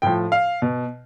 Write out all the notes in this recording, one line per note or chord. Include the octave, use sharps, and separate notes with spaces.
A2 F3 G5
F5
B2